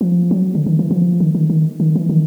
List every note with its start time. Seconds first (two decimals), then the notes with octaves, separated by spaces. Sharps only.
0.01 F3
0.31 F#3
0.55 D3
0.66 D#3
0.79 E3
0.91 F3
1.20 D#3
1.35 D#3
1.50 D#3
1.80 D#3
1.96 E3
2.10 D#3